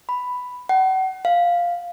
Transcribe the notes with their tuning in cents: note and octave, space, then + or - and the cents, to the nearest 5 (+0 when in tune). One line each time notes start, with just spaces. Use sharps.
B5 +5
F#5 +40
F5 +0